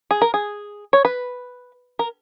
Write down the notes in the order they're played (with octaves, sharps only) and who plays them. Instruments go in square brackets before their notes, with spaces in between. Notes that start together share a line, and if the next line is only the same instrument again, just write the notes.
[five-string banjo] G#4
A#4
G#4
C#5
B4
A#4